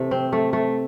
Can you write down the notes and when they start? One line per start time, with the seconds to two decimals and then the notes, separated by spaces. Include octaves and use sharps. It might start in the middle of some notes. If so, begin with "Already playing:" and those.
Already playing: C3 E3 A3
0.11 C4
0.33 A3
0.53 A3